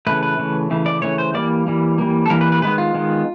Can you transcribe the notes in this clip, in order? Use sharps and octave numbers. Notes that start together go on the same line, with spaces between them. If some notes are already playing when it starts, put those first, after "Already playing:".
C#3 E3 A3 B4
B4
C#3 E3 A3
C#3 E3 A3
D5
C#3 E3 A3 C#5
C5
E3 G3 A#3 D5
E3 G3 A#3
E3 G3 A#3
A4
E3 G3 A#3 A#4
B4
B4
D#3 G#3 B3 B4
F4
D#3 G#3 B3